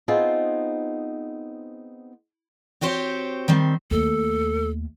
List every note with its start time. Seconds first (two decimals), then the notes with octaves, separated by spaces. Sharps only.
0.08 B3 C4 D#4 F4 G#4 C5
2.81 C4 F#4 G4 C5 C#5
3.48 D#3 G3 C4
3.91 D#2 A3 A4